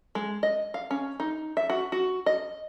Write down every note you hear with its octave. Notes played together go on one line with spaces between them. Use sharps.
G#3
D#5
F5
C#4
D#4
E5
F#4
F#4
D#5